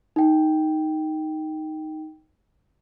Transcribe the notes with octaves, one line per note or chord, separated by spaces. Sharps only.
D#4 G5